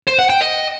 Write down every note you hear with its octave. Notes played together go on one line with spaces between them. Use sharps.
C5
F#5
G5
D#5